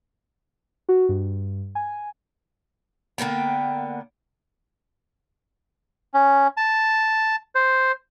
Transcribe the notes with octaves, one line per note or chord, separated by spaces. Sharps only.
F#4
G2
G#5
D3 A#3 B3 G5
C#4
A5
C5